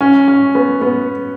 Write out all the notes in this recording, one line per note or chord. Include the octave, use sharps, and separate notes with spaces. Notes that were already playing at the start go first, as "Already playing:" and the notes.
C#4
C#4
B3
B3